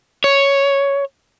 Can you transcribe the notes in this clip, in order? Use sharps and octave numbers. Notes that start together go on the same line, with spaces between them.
C#5